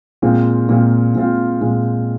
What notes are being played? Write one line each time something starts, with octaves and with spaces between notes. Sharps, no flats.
A#2 G#3 C4 F4
A#2 G#3 C4 F4
A#2 G#3 C4 F4
A#2 G#3 C4 F4